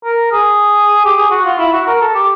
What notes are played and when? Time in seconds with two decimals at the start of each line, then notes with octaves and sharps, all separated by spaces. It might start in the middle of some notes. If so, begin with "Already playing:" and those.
0.04 A#4
0.32 G#4
1.05 G4
1.16 G#4
1.30 F#4
1.45 F4
1.59 E4
1.73 F#4
1.87 A#4
2.01 A4
2.15 G4